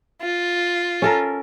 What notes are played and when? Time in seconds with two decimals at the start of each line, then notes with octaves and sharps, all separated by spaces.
0.21 F4
1.02 C#4 A4 A#4